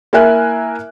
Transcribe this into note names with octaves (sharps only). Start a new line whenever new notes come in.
A#3 E4 A#4 E5 G#5 F#6